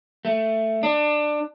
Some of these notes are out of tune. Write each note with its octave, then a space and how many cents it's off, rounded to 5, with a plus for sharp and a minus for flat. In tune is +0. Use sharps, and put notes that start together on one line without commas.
A3 +10
D4 +20